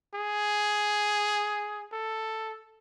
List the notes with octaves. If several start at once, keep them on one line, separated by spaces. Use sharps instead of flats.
G#4
A4